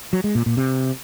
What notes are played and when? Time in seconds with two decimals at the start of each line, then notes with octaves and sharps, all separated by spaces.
0.13 F#3
0.24 G#3
0.35 A#2
0.46 A#2
0.57 C3